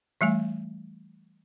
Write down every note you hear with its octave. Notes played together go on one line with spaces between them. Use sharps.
E3 G3 A3 G#5